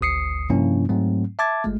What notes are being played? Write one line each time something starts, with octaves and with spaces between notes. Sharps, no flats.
G#1 D2 D#6 C7 C#7
G2 C3 F3 A#3 C#4 E4
G#2 F#3 A3 C4
E5 A5 D6 G#6 A6
G1 G#3 A3